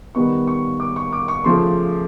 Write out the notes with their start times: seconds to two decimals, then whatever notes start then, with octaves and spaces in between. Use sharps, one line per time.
0.15 D#3 G3 B3 D#4 C#6
0.47 C#6
0.80 D6
0.96 C#6
1.13 D6
1.28 C#6
1.44 C#3 F3 A3 C6